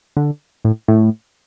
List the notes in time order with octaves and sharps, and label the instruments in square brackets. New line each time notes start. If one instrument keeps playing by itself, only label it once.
[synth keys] D3
A2
A2